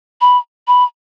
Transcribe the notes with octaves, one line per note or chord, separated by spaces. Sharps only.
B5
B5